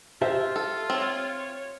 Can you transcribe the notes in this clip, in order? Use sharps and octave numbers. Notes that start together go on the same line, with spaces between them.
F4 G4 C5 E5
A4
C4 C#5